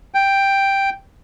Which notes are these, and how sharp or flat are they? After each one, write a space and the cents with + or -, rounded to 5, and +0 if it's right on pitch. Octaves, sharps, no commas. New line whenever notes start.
G5 +5